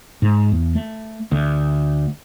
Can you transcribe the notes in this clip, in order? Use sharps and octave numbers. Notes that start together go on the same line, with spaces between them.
G#2
E2
A3
D2